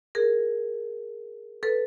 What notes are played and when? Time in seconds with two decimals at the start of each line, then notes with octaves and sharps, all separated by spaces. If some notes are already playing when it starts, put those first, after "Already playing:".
0.15 G#4 A#4
1.63 A4 B4